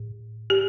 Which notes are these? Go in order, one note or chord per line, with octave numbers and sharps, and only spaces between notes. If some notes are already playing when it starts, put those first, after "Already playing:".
Already playing: A2
G4